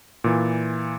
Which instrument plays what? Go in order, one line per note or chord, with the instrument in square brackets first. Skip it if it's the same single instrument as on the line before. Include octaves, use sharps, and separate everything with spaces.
[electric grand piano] A#2 E3